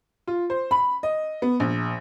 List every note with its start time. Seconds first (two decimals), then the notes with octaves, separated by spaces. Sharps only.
0.28 F4
0.50 C5
0.71 B5
1.03 D#5
1.42 B3
1.60 A#1